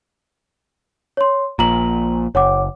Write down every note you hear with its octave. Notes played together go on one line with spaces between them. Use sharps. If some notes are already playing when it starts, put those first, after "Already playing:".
C#5 C6
A#1 A#2 A#5 F#7
F#1 C#5 F#5 D6